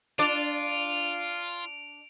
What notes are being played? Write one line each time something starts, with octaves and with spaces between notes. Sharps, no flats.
D4 F4 D5 D7 F7